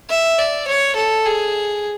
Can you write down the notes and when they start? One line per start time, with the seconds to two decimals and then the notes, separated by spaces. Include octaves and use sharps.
0.10 E5
0.39 D5
0.68 C#5
0.96 A4
1.26 G#4